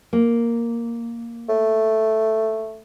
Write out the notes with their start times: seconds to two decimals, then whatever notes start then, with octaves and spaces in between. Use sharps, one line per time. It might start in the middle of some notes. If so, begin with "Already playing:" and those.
0.13 A#3
1.49 A3